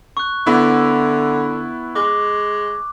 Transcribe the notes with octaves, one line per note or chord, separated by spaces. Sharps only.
C#6 F#6
D3 B3 E4
G#3 D6